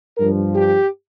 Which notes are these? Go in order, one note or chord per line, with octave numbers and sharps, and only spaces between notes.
G2 F3 A#4
G4